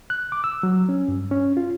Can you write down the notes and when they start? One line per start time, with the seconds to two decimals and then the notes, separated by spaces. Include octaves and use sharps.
0.10 F#6
0.32 D6
0.44 E6
0.63 F#3
0.89 C#4
1.08 G2
1.31 C#4
1.57 F4